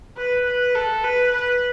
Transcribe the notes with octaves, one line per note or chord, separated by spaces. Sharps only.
B4
B4
A4
B4
B4